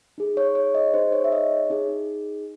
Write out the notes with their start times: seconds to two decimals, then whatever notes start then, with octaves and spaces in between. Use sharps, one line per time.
0.18 D#4 G#4
0.37 C#5
0.55 C#5
0.75 D#5
0.94 D#4 G#4 C5
1.12 C#5
1.24 E5
1.32 D#5
1.51 C#5
1.70 D#4 G#4